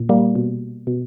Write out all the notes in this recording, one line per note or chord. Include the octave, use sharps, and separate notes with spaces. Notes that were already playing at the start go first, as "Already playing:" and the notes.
Already playing: A#2
G3 A#3
B2
B2